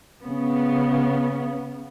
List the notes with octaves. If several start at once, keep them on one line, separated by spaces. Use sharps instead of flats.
C#3 B3